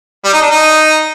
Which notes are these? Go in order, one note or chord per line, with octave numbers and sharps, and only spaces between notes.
G3
D#4
D4
D#4